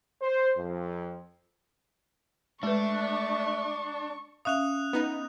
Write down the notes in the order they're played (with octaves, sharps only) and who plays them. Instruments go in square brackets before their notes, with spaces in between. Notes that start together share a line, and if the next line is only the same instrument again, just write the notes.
[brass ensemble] C5
F2
[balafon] G#3 B4 [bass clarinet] A3 [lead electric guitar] D4 [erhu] C#6
[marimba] C#4 E5 F5 [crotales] D#6 F#6 F7
[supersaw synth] B3 D#4